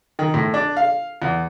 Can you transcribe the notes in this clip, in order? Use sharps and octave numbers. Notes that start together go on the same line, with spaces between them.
D#3
A2
D4
F5
E2